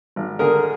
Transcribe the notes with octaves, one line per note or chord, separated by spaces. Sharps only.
G#1
D3 G#4 A#4